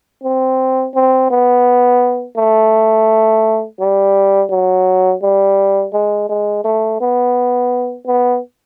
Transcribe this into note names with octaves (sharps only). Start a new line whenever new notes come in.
C4
C4
B3
A3
G3
F#3
G3
G#3
G#3
A3
B3
B3